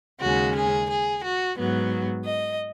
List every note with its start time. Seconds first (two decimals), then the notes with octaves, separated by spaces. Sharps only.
0.21 D#2 C#3 G#3 C#4 F#4
0.56 G#4
0.89 G#4
1.23 F#4
1.57 G#2 F#3 B3
2.25 D#5